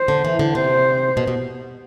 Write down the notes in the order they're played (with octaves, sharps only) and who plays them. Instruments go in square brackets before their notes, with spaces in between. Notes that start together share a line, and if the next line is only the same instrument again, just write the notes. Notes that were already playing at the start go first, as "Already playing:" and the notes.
Already playing: [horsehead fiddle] C5
[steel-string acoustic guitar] D3
E3
D3
[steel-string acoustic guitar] C3 [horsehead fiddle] C5
[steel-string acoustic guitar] B2
B2